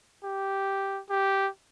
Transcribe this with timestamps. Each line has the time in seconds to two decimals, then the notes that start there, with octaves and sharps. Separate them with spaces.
0.23 G4
1.09 G4